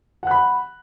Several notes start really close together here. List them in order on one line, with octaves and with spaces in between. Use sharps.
F#5 F#6 B5